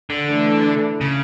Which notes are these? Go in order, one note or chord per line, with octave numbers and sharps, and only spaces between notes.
D3
E3 A3 D4 A4
C#3